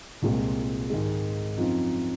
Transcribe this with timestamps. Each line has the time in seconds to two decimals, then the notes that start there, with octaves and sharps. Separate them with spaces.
0.22 C2 A#2 G#3 C4
0.90 G#2 D#3 G#3
1.58 F#2 F3 C4 D#4